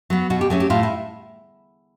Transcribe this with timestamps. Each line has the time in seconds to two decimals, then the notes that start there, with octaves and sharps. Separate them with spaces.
0.10 F#3 B3
0.30 B2 F#4
0.41 G4
0.50 F#3 A3 C#4 G#4
0.60 G4
0.70 A2 F4
0.83 E4